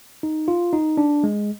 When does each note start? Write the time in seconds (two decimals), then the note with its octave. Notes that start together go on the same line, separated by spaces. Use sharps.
0.23 D#4
0.48 F4
0.73 D#4
0.97 D4
1.24 G#3